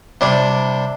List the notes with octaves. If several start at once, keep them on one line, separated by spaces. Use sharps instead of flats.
C3 G3 D4